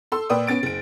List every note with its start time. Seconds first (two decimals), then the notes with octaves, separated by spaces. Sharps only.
0.12 A4 C6 E6
0.29 A#2 B4 D5 G5 D#6 E6
0.47 B3 C#4 A6 D7
0.63 F#1 D7